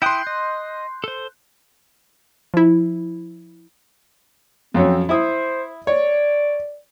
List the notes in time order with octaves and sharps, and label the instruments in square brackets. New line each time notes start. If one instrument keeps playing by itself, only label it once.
[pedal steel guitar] E4 G5 D#6 [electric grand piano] C6 F#6 G6
[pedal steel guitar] D#5
A4 C5
[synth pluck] F3 E4
[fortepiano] F2 F#3 C#4 [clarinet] C4
[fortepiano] E4 E5 D#6 [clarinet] C5
[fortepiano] C#5 [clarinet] D5